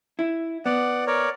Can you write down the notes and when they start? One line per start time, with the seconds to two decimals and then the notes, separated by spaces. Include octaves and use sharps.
0.19 E4
0.66 B3 D5 F#5
1.07 A#4 C#5 D5